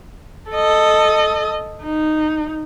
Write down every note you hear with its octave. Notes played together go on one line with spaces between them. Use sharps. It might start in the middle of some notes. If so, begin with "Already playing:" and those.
A4 D#5
D#4